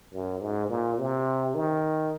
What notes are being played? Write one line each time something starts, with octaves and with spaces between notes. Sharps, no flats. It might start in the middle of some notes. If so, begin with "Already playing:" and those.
F#2
G#2
A#2
C3
D#3